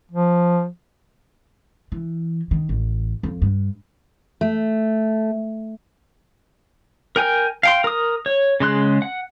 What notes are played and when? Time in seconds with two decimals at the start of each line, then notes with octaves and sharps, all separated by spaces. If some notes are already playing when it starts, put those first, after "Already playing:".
0.12 F3
1.92 E3
2.51 D#3
2.69 A1
3.23 F2
3.42 G2
4.41 A3
7.16 A#4 G5 G#5
7.63 F5 G5 C6
7.84 A#4 D#6
8.26 C#5
8.60 C#3 G#3 C6 F#6
9.02 F#5